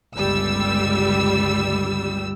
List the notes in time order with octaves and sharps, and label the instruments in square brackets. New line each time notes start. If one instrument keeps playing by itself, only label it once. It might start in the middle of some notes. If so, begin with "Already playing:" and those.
[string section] G1 C#2 G3 E6